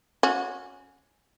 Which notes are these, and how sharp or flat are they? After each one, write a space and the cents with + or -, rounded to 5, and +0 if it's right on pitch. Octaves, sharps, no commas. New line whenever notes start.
C#4 +0 F#4 -25